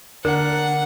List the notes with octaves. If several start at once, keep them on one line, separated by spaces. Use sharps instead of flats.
D3 D4 A#4 F#5